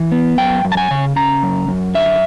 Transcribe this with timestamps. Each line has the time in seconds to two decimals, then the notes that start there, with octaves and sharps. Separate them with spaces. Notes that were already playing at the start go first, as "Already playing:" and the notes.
Already playing: E3
0.12 B3
0.38 F#2 G5
0.65 F#2
0.72 A5
0.77 G#5
0.91 C#3
1.16 C#3 A#5
1.43 F#2
1.68 F#2
1.94 D3 E5